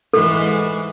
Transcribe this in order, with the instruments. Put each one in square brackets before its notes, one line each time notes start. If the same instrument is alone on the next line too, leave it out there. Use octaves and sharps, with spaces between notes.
[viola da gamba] G#2 E3 G#3 [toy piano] A4